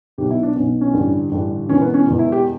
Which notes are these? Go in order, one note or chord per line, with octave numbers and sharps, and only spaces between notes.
B1 B2 G4
E4
D4
B1 B2 C#4
C#4
A1 G2 D3
A1 G2 D3
E1 E2 B2 C#4
B3
C#4
E1 E2 B2
E4
G4